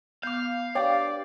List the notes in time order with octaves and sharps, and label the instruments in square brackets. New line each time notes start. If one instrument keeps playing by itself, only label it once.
[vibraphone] B3 [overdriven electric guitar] F5 [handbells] D6 G6
[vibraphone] D4 G4 B4 [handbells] C#5 G5 [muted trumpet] D5